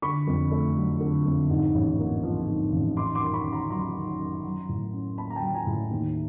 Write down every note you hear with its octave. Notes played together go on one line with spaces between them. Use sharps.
D3 B5 C#6
F2
A3
F#3
D3
F2
G#2
A1
A#3
F3
G#2
A1
D#3 C6 D6
C6 D6
F#2
B5 C#6
F#2
A#5 C6
F#3 A#5 C6
D#3
F#2
F#3
A2
C#4
A#3 A5 B5
A#5
G5 A5
F#3
G#5 A#5
A2
D#2